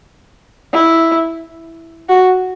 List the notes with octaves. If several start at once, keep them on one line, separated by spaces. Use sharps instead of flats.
E4
F#4